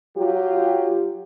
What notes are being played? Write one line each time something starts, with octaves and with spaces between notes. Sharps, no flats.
F#3 F4 G4